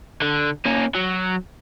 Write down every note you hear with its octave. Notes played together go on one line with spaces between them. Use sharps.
D3
A#3 C#4
F#3